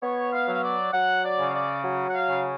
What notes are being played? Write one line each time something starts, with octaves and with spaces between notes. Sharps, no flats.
B3 C#5
F5
F#3
F5
D5
F#3 F#5
D5
C#3
F5
D5
F#3
F#5
F5
C#3